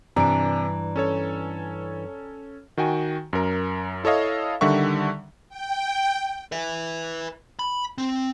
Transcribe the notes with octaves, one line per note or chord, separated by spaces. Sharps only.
G2 C3 E3 D4 D5 A#5 D7
C#4 A4 C#5
D#3 F#4 G5 G#5
F#2 A#4
E4 A4 C#5 D#5 F5
D3 D#3 G3 E5 F#5 C#6
G5
B4 E5
B5
C4